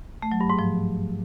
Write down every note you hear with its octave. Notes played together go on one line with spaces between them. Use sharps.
A3
F#3
G2
G#2
F3